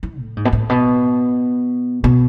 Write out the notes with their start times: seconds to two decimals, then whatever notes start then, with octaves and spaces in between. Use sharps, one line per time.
0.03 E3
0.20 A2
0.37 G#2
0.45 B2
0.52 A2
0.69 B2
2.04 B2